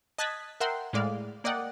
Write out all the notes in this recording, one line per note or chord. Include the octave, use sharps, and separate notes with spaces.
D#5 A5 F#6 G#6 A6 B6
A#4 E5 F#5 G5 C6
A2 G#3 D5 F5
A#3 D5 D#5 F#5 G5